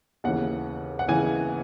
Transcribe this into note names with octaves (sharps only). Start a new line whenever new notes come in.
D#2 C#3 E3 F#5
F#5
C#3 E3 G#5